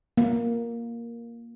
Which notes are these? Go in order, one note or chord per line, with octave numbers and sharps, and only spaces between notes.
A#3